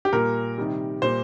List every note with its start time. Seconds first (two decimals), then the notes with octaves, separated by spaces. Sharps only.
0.05 G4
0.13 A#2 G3 A#4
0.58 C3 D#3 G3
1.02 A#2 G3 C5